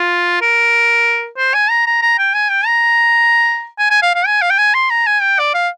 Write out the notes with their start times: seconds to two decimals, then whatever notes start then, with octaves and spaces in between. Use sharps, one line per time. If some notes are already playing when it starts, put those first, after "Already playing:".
Already playing: F4
0.42 A#4
1.37 C5
1.54 G#5
1.70 A#5
1.87 A#5
2.02 A#5
2.19 G5
2.34 G#5
2.50 G5
2.66 A#5
3.79 G#5
3.90 G#5
4.02 F5
4.15 F5
4.26 G#5
4.42 F5
4.50 G5
4.59 G#5
4.74 C6
4.90 A#5
5.06 G#5
5.22 G5
5.39 D5
5.54 F5